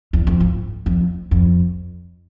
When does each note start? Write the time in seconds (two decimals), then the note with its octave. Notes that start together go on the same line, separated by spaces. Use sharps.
0.13 E2
0.27 F2
0.40 G#2
0.86 F2
1.31 F2